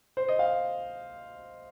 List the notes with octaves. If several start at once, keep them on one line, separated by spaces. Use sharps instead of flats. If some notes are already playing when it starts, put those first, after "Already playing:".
C5
D#5
F5